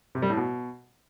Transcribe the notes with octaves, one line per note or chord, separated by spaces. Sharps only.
C3
G3
A2
B2